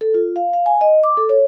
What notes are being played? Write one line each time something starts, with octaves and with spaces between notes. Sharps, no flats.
A4
F4
F5
F5
G#5
D#5
D6
A4
C#5